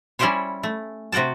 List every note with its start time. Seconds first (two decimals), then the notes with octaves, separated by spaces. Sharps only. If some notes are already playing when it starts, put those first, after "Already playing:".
0.19 G3 C#4 E4 G4 C5 C#5
0.63 A3
1.12 C3 F#4 F#5 G5 A5